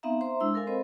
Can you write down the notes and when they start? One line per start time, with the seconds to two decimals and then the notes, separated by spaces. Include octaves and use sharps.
0.03 B3 C4 D#4 E5 F5 A#5
0.21 C5 E5 A#5 C6
0.40 G#3 D4 E4 E6
0.54 A4 A#4 F5 G#5
0.67 C4 A4 C5 D#5 B5